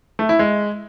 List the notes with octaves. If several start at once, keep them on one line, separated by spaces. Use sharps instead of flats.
A3
E4
G#3